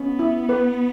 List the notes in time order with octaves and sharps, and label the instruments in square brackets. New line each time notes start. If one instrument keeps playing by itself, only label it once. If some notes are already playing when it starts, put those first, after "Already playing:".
Already playing: [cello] B3 [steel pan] C#4
[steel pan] E4
B4